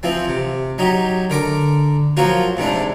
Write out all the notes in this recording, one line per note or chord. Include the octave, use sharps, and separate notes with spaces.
E3 F3 C4
C3
F#3 D#4 G4
D3 A#4 D6
F3 F#3 A#3 F4 F#4
G#2 C3 E3 D4